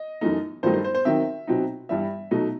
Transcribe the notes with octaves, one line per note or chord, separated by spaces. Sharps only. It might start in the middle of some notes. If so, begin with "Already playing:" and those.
Already playing: D#5
F#2 E3 A3 D#4
G2 D#3 F#3 A3 D#4 C5
C5
C5
C5
D#3 F#3 C4 D#4 E5
B2 F#3 C4 D#4
G2 E3 G3 E5
B2 F#3 A3 D#4